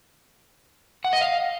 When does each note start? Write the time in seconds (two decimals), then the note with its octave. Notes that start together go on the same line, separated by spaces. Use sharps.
1.04 F#5
1.13 D#5
1.21 F5